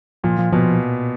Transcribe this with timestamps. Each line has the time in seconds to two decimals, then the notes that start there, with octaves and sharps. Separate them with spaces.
0.24 A#2 F3
0.39 F3
0.52 B2 F3